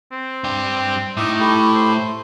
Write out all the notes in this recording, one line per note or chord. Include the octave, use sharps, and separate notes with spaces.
C4
G2 G4
A2 D#4 E5 D6
A3 E4 G4
C5